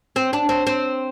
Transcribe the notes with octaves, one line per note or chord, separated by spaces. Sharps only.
C4
D4
C4
C4